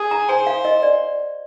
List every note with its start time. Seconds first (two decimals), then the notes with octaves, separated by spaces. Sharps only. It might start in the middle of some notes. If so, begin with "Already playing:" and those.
Already playing: G#4
0.11 A#5
0.28 C5 G#5
0.47 F5
0.65 D#5
0.83 D5